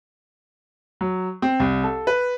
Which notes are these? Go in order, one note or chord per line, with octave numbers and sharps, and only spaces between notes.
F#3
C4
C2
A4
B4